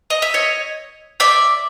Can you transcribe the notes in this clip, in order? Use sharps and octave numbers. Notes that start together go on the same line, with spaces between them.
D#5
E5
C#5 D#5
D5 E5